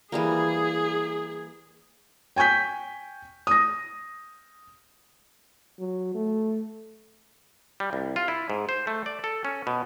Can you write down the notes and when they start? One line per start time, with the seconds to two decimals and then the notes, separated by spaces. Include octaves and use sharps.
0.12 E3 G3 A#3 G#4
2.36 G5 G#5 C#6 G6 B6
3.47 D#6 A#6
5.79 F#3
6.15 A3
7.80 G3
7.93 C2
8.16 F4
8.28 E4
8.50 G#2
8.69 C5
8.87 A3
9.06 D5
9.24 A4
9.45 C#4
9.67 B2